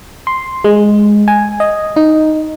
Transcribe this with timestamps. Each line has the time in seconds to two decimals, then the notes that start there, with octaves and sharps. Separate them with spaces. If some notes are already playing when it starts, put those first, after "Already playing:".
0.27 C6
0.64 G#3
1.28 G#5
1.60 D#5
1.96 D#4